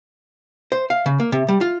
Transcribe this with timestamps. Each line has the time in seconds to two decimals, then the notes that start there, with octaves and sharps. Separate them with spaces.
0.72 C5
0.90 F5
1.06 C#3
1.20 A#3
1.32 C3
1.49 G3
1.61 F4